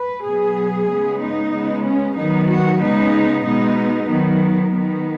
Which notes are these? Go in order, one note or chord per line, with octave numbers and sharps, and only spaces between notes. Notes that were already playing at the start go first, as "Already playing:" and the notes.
Already playing: B4
B2 F#3 B3 G#4
C#3 G#3 B3
D#4
C#3 G#3 B3
C#4
D#3 F#3 B3 D#4
F#4
C#3 G#3 B3 D#4
B2 G#3 B3 D#4
D#3 F#3 B3
D#3 B3